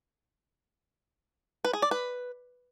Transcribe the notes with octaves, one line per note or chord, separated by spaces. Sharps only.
B4
G#4
D5
B4